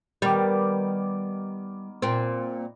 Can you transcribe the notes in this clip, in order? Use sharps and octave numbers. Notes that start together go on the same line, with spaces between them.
D#3 G3 B3 D5
A#2 C4